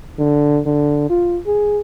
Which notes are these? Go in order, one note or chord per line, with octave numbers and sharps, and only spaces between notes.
D3
D3
F4
G#4